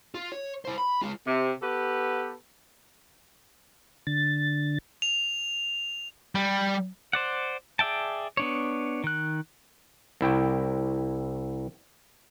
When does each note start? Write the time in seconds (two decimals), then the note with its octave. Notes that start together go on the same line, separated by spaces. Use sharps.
0.14 F4
0.32 C#5
0.65 E4 C5
0.78 B5
1.02 G#3 F4
1.26 C3
1.62 B3 G4 A4 B4
4.07 D3 A6
5.02 F7
6.35 G3
7.13 C5 D5 F#5
7.79 G#4 D5 E5 G5 A5
8.37 B3 D4 C#5
9.04 D#3 F#6
10.21 C2 E4 G5